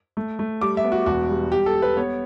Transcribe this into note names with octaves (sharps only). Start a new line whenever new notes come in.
A3
A3
G3 D6
E5
B3
F#4
E1 F#4
G3
G3 G4
A4
G3
B4
B3 C#5